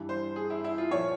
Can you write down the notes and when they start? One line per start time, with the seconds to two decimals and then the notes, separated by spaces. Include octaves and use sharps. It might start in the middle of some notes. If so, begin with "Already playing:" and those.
Already playing: G2 E3 G3
0.09 C5
0.36 G#4
0.50 E4
0.64 E4
0.78 F4
0.91 A#2 F3 C#5